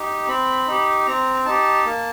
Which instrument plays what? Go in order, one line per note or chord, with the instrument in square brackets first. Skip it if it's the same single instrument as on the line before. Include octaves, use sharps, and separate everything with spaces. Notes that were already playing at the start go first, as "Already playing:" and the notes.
Already playing: [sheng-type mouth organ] D#4 G4
C4 B5
D#4 G4
C4 A#5
D#4 G4 A5
A#3